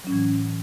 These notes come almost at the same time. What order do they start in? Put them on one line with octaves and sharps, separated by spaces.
F#3 C#4 A2 E3